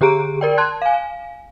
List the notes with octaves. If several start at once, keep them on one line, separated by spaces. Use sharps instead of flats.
D3 G4 G#4 A#5 D7
A#4 D5 G5
A5 C6 F#6 G#6
F5 G#5